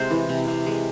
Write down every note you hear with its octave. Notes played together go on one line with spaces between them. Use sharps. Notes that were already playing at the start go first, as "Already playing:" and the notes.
Already playing: C3 G#3 C5
E3
C3
C3
G#3